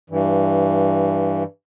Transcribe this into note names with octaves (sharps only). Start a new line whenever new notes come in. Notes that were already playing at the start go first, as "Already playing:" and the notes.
G2 E3